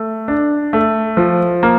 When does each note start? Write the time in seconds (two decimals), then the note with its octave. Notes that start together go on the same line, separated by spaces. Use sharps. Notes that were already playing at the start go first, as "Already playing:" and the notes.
Already playing: A3
0.28 D4
0.73 A3
1.17 F3
1.63 A#3